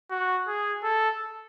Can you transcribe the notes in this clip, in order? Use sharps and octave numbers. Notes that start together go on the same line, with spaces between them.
F#4
G#4
A4